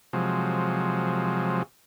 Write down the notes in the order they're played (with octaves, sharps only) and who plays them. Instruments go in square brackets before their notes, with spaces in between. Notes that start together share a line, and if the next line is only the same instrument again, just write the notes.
[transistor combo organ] C3 F3 F#3 G#3